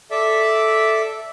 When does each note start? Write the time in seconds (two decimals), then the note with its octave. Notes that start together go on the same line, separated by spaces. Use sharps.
0.11 A4 D5 E5